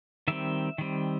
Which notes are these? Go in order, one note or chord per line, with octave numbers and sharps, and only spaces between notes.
D#3 G3 C4 E5
D#3 G3 C4